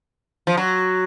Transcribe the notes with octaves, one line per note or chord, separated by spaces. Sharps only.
F3
F#3